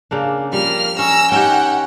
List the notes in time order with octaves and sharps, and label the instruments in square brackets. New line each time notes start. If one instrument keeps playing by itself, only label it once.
[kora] C#3 A#3 D4
[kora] F3 G3 [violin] A#3 F6
[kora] C#4 [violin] A#5 E6
[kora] C#4 D#4 G4 [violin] F#5 G5